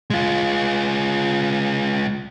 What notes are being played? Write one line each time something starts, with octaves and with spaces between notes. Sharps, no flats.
G#3 F4